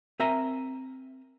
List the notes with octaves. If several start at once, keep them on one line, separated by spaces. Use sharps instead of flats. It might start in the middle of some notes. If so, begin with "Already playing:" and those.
C4 A#4 E5 G#5 A#5